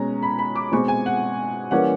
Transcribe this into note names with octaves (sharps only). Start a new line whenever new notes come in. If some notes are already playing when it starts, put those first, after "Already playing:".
Already playing: B2 G#3 C#4 A#5
B5
B5
D6
B2 G#3 C4 C#6
G#5
F#5
E3 G3 A#3 C#4 F#5